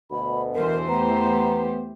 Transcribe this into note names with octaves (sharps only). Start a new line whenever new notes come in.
D2 B2 B5
E2 E3 A#4 C5
A3 B3 G4 A#5